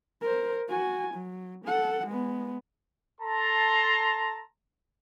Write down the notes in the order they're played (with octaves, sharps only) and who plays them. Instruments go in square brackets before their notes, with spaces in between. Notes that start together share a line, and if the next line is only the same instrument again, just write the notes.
[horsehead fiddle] A#4 C5
F#4 G#5
F#3
A4 F#5
G#3 B3
[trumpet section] A4 A5 A#5 C6